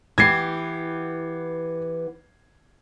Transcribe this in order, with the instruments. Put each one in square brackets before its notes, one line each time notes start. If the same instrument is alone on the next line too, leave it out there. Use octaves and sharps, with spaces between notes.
[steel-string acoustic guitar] E3 B3 G4 [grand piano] G#6 C7